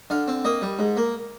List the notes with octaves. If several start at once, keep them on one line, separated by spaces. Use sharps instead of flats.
D3 F5
C4
A#3 D#5
G3
G#2
A#3